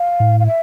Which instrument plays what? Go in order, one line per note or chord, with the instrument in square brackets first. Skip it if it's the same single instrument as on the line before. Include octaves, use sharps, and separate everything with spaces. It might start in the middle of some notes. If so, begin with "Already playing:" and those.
Already playing: [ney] F5
[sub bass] A2
[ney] F5
E5